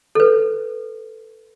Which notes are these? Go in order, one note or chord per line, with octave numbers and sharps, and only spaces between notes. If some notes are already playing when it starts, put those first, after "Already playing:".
A4 B4